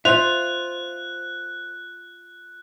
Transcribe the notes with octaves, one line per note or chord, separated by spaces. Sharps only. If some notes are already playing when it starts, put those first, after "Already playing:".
F4 C5 E5 F#6 F7